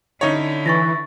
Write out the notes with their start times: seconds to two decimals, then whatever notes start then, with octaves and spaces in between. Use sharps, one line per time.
0.21 D3 C#4 D#4 E4 C#5
0.66 E3 C#6 A6 A#6